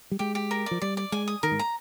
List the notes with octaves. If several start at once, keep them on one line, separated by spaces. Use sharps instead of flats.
G3
G#3 G4
G4
A#4
D5
F3
G3 D5
D5
G#3 G#5
D#6
D#3 A#4
G#2
A#5